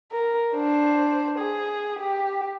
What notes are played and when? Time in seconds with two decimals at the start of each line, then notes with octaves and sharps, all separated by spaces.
0.12 A#4
0.53 D4 C5
1.39 G#4
1.99 G4